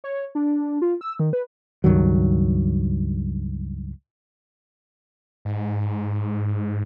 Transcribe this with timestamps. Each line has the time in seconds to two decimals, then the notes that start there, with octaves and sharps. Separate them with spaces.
0.04 C#5
0.35 D4
0.82 F4
1.01 E6
1.19 D#3
1.33 B4
1.84 C#2 G2 D#3 F#3
5.45 G#2